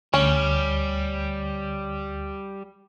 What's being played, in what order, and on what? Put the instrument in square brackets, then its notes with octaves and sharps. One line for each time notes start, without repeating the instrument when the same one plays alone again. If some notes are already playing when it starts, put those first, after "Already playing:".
[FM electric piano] D2 [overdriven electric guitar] G3 [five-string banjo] C#4